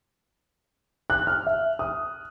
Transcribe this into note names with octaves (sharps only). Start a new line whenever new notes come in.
F#6
F6
E5
D#6